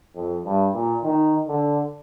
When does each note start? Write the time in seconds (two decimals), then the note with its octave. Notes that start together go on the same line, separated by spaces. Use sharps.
0.15 F2
0.45 G2
0.74 A#2
1.03 D#3
1.47 D3